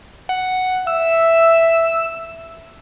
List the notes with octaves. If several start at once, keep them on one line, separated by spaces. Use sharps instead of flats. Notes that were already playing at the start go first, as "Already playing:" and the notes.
F#5
E5 E6